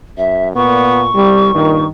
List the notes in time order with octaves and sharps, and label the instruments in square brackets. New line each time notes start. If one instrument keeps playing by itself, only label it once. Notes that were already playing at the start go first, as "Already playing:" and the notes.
[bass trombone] F#2 [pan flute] E5
[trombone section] A#2 [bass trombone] B3 [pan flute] C#6
[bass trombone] C2 [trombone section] G3
[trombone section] G2 D#3 [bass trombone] A#2